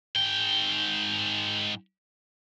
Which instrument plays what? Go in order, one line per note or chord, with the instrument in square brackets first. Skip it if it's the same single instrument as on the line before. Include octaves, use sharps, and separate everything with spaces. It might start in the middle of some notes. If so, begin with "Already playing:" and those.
[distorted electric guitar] G#2 G5